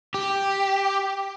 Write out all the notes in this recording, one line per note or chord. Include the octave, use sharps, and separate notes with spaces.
G4